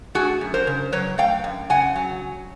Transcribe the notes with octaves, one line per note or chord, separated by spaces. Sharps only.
A3 F#4 G#4
F#2
A#4 C5
C#3
F#3 B4 C#5
A3 F5 G5
F#2
C#3 F#5 G#5
F#3